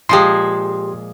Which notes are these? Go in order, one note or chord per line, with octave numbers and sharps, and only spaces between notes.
A#2 F3 G#3 G4 C6